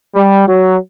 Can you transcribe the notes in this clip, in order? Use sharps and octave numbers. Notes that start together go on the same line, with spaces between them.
G3
F#3